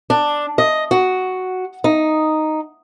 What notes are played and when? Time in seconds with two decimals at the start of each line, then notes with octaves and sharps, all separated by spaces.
0.10 D4
0.58 D#5
0.91 F#4
1.84 D#4